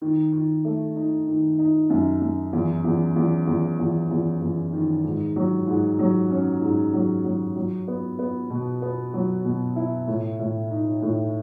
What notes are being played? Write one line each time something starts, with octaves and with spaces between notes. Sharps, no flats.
D#3
D#3
A3
D#4
D#3
D#4
F#2
F#2
E2
E2
E2
E2
E2
E2
E2
D#3
G#2
F#3
G#2
F#3
C#4
G#2
F#3
F#3
F#3
B3
B3
B2
B3
F#3
B2
E4
A2
A2
D#4
A2